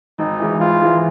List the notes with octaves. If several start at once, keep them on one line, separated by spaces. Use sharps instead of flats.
G#1 D#4
G#2 E3
G#1 F4
G#2 E3